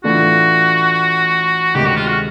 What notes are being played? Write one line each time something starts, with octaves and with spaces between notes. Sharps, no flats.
A2 E3 A3 D4 F4 F#4
D2 C3 D#3 G#3 G4
F#4
F4
F#4